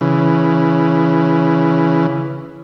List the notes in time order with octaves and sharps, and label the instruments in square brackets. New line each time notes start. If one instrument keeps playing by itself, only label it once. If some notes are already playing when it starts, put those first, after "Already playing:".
[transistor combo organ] C#3 E3